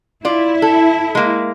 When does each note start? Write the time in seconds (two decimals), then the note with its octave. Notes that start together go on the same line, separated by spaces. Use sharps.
0.25 E4 F4 D5
0.62 A4
1.15 G#3 A#3